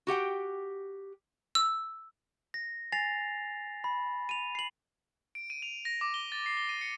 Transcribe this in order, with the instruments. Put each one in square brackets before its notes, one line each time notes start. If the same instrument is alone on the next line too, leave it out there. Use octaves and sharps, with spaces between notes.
[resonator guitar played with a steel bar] F#4 G4 F#5 G5
[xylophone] E6
[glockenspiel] A#6
G#5 A6 A#6 C7 F7
B5
D#7 F7
C7 F#7
[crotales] D7
D#7
F7
A#6
D6
G7
A6
C7
G7
D#7
C#7